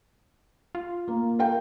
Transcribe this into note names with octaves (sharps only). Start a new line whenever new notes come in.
F4
A#3
A#4 F5 G5